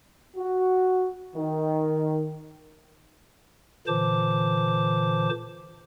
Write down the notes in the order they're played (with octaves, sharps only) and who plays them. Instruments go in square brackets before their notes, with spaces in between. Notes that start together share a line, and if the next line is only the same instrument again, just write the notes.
[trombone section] F#4
D#3
[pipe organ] A#2 D3 E3 C5 A5 D6